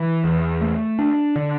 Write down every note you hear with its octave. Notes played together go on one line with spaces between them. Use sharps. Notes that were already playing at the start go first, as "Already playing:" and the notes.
Already playing: E3
E2
A3
D4
D3